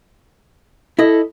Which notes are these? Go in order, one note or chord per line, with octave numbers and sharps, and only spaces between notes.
E4 A4 D#5